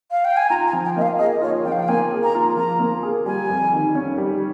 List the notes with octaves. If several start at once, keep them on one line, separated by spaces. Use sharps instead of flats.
F5
G5
G#5
F4 A#5
G#5
F3
G5
A#3 D#5
F5
G#4 D#5
F4 C#5
F3 G5
F5
G5
A#3 G#5
G#4
A#5
F4
F3 A#5
A#3
G#4
G3 G#5
F2
D#3
C#4
G3